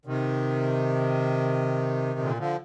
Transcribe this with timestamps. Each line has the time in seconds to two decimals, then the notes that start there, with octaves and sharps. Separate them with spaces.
0.05 C3 D#3
2.19 A#2 D3
2.37 D3 F3